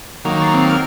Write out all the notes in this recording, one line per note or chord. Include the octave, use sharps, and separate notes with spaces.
D#3 F#3 A#3
C#6 A6 C7
C4
A#4 F6